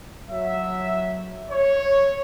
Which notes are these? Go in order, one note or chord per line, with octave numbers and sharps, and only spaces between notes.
F#3 E5
C#5